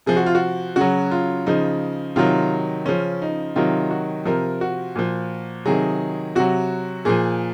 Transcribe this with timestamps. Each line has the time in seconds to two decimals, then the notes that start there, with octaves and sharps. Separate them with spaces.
0.06 C3 F3 G#4
0.17 F#4
0.26 F4
0.35 F#4
0.76 C#3 F#3 F#4
1.11 F4
1.46 C#3 F3 D#4
2.16 C3 D#3 F#3 F4
2.86 C#3 F3 C#4
3.22 D#4
3.56 C3 D#3 F#3 F4
3.91 F#4
4.26 C3 F3 A#4
4.61 F#4
4.95 A#2 F3
5.66 C3 D#3 F#3 G#4
6.35 C3 F#3 F#4
7.05 A#2 F3 G#4